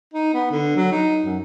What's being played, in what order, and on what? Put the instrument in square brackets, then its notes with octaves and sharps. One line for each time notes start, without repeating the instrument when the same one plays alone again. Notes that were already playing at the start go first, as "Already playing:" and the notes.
[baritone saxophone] D#4
B3
D3
F#3
D#4
F#2